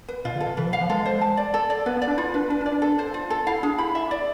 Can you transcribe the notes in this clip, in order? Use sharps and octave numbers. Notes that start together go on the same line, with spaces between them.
B4
B2 F4
D3
A4
C3
E3 B4
F3
F5
F3
G#3 A4
C5
A5
D5
A4
D5
B3 B4
B3
D5
D4
E4 F4
D4 B4
D4 B4
D4
D5
D4
A4
C5
F4
A4
E4 F5
D4 G#4
E4 B5
E5
D5